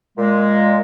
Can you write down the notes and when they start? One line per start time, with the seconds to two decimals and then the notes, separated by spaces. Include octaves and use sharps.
0.17 A#2 G#3